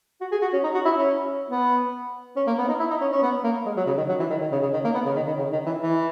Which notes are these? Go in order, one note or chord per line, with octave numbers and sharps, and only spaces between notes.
F#4
G#4
F#4
C#4
D#4
F#4
E4
C#4
B3
C#4
A#3
B3
D#4
E4
D#4
C#4
C#4
B3
A#3
G#3
F#3
C#3
D#3
F#3
E3
D#3
D#3
C#3
C#3
D#3
A#3
B3
C#3
D#3
D#3
C#3
D#3
E3
E3